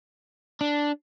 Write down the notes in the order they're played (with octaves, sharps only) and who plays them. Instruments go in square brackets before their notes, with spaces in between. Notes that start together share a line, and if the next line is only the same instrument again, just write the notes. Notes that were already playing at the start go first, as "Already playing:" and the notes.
[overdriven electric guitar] D4